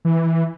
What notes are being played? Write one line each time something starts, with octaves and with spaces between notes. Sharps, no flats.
E3